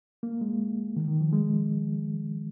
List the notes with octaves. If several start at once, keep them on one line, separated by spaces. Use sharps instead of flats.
A#3
G#3
D#3
D#3
F3
G#3